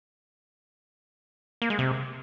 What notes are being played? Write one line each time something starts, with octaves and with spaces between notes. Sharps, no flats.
A#3
G#3
C3